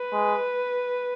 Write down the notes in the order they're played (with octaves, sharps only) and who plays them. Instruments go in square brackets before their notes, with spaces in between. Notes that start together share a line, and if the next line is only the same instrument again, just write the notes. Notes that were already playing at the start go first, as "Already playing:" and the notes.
Already playing: [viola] B4
[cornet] G#3